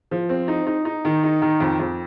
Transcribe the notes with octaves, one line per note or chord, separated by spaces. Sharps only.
F3
C4
D#4
D#4
D#4
D#3
D#4
D#3
F2
F2